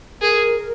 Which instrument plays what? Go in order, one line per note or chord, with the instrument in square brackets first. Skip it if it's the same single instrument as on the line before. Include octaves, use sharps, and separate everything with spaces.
[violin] G#4 [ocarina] A#4